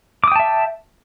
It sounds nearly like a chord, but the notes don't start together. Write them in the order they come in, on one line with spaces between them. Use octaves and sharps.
D6 D#6 G5 A5 E5